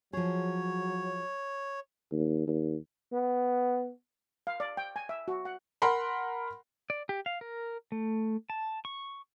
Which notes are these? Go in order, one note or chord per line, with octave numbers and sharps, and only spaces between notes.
F3 F#3 G#4 C#5
D#2
D#2
B3
F5
D5
G5
G#5
E5
F#4
F#5
A#4 F#5 B5 C6
D5
G4
F5
A#4
A3
A5
C#6